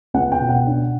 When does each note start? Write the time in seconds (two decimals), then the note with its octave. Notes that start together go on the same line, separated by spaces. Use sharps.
0.14 C#2 F#5
0.32 G5
0.41 B2
0.49 F#5
0.67 D4